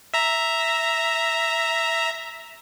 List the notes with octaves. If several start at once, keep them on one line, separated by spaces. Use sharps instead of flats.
E5 A#5